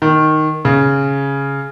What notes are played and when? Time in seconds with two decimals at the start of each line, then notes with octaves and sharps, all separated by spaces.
0.02 D#3
0.65 C#3